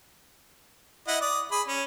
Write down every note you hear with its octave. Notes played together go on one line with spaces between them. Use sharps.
E4 D#5 F#5
D5 D#6
G#4 B5
C#4